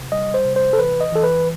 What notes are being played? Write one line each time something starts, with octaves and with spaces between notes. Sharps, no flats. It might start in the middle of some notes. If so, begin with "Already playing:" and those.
Already playing: C3
G3 D#5
C5
C3
C5
A4
E3 B4
D#5
E3 A4
B4